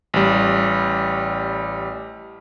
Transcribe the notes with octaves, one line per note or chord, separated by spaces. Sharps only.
A1 G3